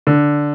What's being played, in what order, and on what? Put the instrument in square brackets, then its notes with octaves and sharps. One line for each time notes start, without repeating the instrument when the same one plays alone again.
[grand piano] D3